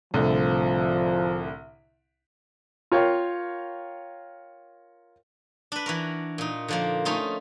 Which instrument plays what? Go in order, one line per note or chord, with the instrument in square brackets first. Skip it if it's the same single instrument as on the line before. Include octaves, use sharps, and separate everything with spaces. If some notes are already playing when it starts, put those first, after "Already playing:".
[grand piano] C2 A2 D3 [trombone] F3
[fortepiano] F4 A#4 C#5 F5 G5
[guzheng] D4 B4
E3 F#4 A#4
A#2 D#4
D3 F3 A#3
A3 C#4 D#4 F4